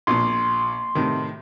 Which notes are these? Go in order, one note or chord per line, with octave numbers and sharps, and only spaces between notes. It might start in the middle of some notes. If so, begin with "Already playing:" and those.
A#1 A#2 C6
A2 C3 D#3